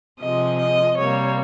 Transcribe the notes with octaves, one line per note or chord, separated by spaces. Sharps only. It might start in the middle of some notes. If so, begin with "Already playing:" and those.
C3 F3 G#3 D#5
D#5
C3 G3 A#3 C#5